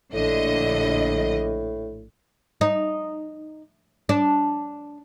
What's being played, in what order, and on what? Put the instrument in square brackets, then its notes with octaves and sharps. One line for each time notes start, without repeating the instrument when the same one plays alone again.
[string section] A#1 D3 D#5 [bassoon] A2
[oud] D#4
D4